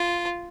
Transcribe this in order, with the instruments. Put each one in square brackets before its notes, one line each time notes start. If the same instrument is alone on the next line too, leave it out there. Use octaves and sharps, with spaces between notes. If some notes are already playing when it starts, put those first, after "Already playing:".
Already playing: [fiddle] F4